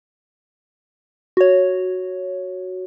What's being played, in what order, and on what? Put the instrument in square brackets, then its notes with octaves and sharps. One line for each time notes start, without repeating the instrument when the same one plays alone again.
[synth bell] F#4 C#5